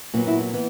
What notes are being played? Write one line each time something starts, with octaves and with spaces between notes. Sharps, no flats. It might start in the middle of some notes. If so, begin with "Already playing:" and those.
A#2 F#3 B3 F#4
E4
E4
E3 B3